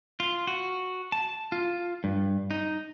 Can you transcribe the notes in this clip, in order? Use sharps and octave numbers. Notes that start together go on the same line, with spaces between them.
F4
F#4
A5
F4
G2
D#4